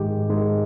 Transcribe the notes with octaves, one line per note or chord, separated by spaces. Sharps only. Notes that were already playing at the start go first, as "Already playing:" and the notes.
Already playing: G#2 D#3 G#3 G4
G#2 D#3 G#3